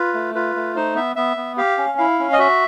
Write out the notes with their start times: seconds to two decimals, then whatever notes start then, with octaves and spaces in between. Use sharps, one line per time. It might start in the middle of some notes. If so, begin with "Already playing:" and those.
Already playing: F4 B4
0.14 A3
0.35 F4 B4
0.56 A3
0.76 D#4 C5
0.95 B3 E5
1.16 B3 E5
1.37 B3
1.57 G4 F5
1.78 C#4
1.98 E4 F5
2.19 C#4
2.33 D#5
2.39 F#4 E5